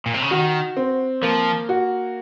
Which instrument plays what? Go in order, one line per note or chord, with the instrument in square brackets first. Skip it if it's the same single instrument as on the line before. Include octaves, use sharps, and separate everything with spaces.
[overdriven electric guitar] A#2
C3
C#3
[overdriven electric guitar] D#3 [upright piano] F#4
[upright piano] C4
[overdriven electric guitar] F3 [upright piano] A#3
[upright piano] F#4